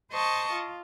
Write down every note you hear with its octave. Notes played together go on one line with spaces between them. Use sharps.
C5 D#5 A5 C#6
F4